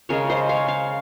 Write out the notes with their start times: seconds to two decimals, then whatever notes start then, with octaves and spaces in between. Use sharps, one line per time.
0.09 C#3 G#3 A#4 C#5
0.30 C5 D#5
0.49 C#5 F5
0.68 C#5 F5